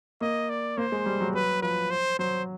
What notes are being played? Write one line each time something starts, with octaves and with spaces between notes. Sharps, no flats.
A#3 D#5
D5
A#3 C5
G#3
G3
F#3
F#3 B4
F3 B4
C5
F#3 C5